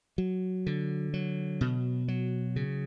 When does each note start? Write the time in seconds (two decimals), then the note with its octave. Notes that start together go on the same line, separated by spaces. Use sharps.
0.18 F#3
0.67 D3
1.14 F#3
1.61 B2
2.08 F#3
2.56 C#3